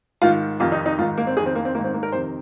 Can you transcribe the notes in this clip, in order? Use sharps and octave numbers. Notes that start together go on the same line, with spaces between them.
G#2 D#3 F4
F2 C3 D#3 F4
D#4
D#4
G#2 D#3 F4
A#3
C4
F2 D#3 G#4
C4
A#3
C4
G#2 D#3 A#3
C4
A#3
A#4
F2 C3 D#3 C5